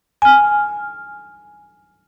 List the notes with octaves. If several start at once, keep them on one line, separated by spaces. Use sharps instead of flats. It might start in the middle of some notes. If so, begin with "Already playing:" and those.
G#5 F6